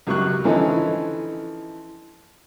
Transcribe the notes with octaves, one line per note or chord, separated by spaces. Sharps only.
C#2 F#2 F#3 G4 C#6 F#6
D3 E3 F3 C#4 D#4 E4